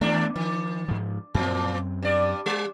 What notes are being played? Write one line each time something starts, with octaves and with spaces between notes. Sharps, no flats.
D#2 A3 B3 D4
D#3 F3
G#2 F3
F#2 A2 F3 C4
G2 D5
G3